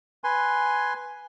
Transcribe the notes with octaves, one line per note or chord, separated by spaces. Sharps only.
B4 G#5 C6